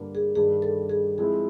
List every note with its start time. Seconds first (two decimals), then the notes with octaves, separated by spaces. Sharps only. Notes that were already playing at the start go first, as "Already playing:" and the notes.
Already playing: G2 D3 G3 A#3
0.15 G#4
0.36 G2 D#3 G3 G#4
0.62 A4
0.89 G#4
1.18 F3 G#3 C4 E4 G#4